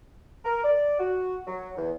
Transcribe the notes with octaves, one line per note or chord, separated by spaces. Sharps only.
A#4
D5
F#4
F#3
E2